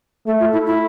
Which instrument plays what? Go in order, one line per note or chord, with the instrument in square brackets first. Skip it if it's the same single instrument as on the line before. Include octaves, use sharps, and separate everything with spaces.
[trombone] A3 [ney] A4
[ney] F4
E4
E4